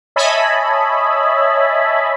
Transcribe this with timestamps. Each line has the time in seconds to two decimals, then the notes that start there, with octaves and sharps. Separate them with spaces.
0.16 C#5 D#5 E5 G#5 A5 B5